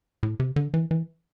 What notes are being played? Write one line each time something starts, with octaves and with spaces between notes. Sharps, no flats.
A2
C3
D3
E3
E3